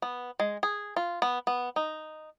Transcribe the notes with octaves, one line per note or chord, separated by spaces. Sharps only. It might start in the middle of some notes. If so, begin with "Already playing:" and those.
B3
G#3
G#4
F4
B3
B3
D#4